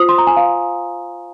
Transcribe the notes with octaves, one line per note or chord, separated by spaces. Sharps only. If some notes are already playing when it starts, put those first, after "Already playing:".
Already playing: F4 C5 D#6
C6
A#5
G#5
F5